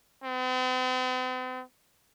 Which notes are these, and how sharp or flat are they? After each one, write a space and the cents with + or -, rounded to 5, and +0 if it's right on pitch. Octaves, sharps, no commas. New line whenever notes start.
C4 -45